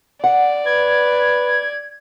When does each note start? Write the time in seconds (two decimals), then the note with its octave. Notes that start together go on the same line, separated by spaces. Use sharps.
0.24 D5 F#5
0.66 B4 G#6